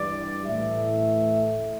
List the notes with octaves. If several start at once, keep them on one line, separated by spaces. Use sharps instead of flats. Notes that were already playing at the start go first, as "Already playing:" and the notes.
Already playing: G2 E3 G3 D5
A2 E3 A3 E5